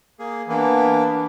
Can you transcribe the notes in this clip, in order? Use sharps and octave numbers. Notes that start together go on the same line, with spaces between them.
A#3 G#4
E3 A#3 B3 D4